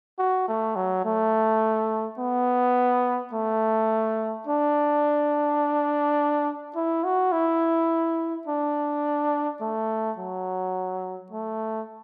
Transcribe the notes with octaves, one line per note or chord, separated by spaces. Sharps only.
F#4
A3
F#3
A3
B3
A3
D4
E4
F#4
E4
D4
A3
F#3
A3